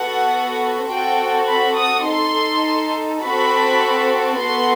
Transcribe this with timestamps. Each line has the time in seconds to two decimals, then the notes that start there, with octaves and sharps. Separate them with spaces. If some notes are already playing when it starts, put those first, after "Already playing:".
Already playing: B3 F#4 A4 F#5
0.88 C4 F#4 A4 G5
1.47 B5
1.76 D#6
2.05 D#4 A4 C6
3.21 C4 F#4 A4 B5
4.38 B3 F#4 A4 C6